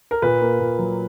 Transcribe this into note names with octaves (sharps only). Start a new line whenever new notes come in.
A#4
A#2 B4
A#3
A#2
F#3